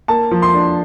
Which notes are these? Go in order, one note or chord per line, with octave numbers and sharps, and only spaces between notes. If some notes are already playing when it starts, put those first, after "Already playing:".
A#3 A5
F3
C6
D4